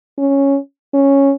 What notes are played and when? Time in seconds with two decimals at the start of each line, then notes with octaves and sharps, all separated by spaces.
0.18 C#4
0.94 C#4